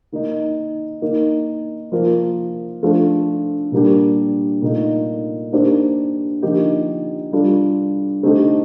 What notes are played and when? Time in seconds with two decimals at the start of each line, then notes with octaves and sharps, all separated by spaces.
0.12 D#3 A#3 D#4
1.02 D#3 A#3 D#4
1.92 F3 A#3 F4 A#4
2.83 F3 A3 D4 F4 A4
3.72 A#2 G3 A#3 D4 G4
4.62 A#2 A3 D#4
5.52 D#3 A#3 D4 G4 C5
6.42 D3 F3 A#3 D#4 G4
7.33 G3 D4 F4 A4
8.23 D3 A3 C4 D#4 G4